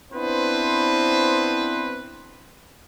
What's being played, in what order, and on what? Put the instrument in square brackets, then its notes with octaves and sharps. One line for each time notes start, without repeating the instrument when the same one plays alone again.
[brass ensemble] B3 C4 D4 E4 B4 C5